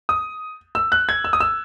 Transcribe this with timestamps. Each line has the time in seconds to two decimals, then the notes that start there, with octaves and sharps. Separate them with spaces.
0.09 D#6
0.75 E6
0.92 F#6
1.09 G#6
1.24 E6
1.33 D#6
1.40 E6